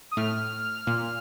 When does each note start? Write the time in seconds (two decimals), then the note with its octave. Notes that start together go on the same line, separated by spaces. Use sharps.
0.11 D#6
0.17 A2 A3 F6
0.87 A#2 A#3